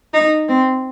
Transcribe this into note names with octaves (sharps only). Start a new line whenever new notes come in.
D#4
C4